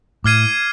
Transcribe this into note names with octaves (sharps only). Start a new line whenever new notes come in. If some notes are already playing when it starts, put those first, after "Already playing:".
A2 D6 F6 G#6 C7 D#7